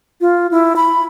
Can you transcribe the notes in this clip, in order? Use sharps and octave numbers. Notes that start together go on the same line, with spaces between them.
F4
E4
B5